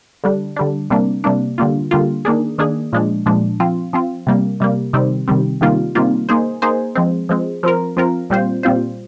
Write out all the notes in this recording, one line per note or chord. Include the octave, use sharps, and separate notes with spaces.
D3 G3 D4
D3 G3 D4
C3 G3 A#3 D4
C3 G3 A#3 D4
D3 G3 A#3 F4
D3 G3 A#3 F4
D#3 A#3 D4 G#4
D#3 A#3 D4 G#4
A#2 F3 G#3 D4
A#2 F3 G#3 D4
F3 C4 F4
F3 C4 F4
C3 G3 A#3
C3 G3 A#3
C3 D#3 G3 C4
C3 D#3 G3 C4
C3 D#3 G3 A#3 F4
C3 D#3 G3 A#3 F4
A#3 D#4 G#4 C5
A#3 D#4 G#4 C5
F3 G#3 C4
F3 G#3 C4
F3 C4 F4 A#4
F3 C4 F4 A#4
A#2 G3 C4 F4 C5
A#2 G3 C4 F4 C5